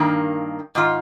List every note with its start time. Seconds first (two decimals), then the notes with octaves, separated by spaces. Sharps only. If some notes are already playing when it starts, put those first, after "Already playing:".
Already playing: G2 D#3 A#3
0.75 G#2 D#3 F4